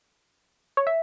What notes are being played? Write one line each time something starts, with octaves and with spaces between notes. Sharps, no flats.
C#5
E5